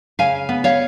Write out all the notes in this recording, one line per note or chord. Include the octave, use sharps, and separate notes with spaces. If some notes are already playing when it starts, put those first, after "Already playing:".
C#3 F5 G#5
B3
C#5 F5